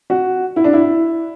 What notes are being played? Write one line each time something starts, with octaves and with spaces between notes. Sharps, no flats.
F#4
E4
D4
E4